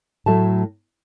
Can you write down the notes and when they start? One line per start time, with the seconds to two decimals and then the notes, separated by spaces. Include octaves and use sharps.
0.26 A2 F#3 A3 A5